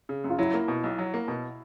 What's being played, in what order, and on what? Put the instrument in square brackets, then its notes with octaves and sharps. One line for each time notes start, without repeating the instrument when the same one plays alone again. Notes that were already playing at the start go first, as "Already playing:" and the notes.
[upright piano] C#3
F#2
[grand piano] F4
[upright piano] F#3 [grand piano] E4
[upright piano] A#3
B2
B1
F#3
A#3
B2